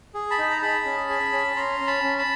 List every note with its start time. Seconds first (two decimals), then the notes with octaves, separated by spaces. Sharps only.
0.14 G#4
0.30 A5 B5
0.38 D#4
0.50 A#5
0.62 G#4 A5 B5
0.85 C#4
1.09 G#4
1.33 C#4
1.56 C#4 A#5 C6
1.80 C#4
1.87 A5 B5
2.03 C#4
2.18 A5 B5